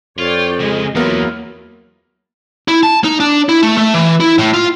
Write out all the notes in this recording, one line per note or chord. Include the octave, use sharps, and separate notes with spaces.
F2 F4 C#5 D5 G5
G#2 C#3 G#3 G#4 D#5
E2 F#3 A#3 B3 E4 F4 A#4
E4
A5
D#4
D4
E4
A3
A3
E3
E4
A2
F4